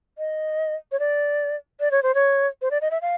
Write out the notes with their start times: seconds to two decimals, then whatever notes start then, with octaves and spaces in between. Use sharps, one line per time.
0.18 D#5
0.92 C#5
0.99 D5
1.80 D5
1.91 C#5
2.03 C5
2.15 C#5
2.62 C5
2.71 D5
2.81 D#5
2.91 E5
3.02 F5